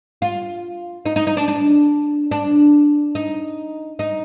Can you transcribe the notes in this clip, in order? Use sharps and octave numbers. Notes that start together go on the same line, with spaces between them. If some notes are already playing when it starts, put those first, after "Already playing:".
F4
D#4
D#4
D#4
D4
D4
D4
D#4
D#4